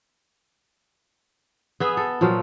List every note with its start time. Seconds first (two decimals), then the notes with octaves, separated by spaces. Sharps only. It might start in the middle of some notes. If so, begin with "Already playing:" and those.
1.80 B3 G#4 E5
1.97 A4
2.21 A#2 F3 F#3 F5